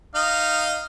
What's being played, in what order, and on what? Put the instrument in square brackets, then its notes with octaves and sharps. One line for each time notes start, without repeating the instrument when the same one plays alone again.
[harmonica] D#4 D#5 F5